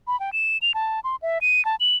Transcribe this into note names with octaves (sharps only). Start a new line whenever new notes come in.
B5
G5
E7
F7
A5
C6
E5
D#7
A5
F#7